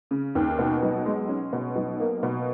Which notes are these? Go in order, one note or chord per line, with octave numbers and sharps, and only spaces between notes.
C#3
D#2
B2
B1
G#3
C#4
B2
B1
A#3
B2